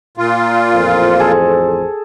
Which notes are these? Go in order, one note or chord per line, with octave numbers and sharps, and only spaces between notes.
A#2 F4
A1 F2 C5
G#4 A4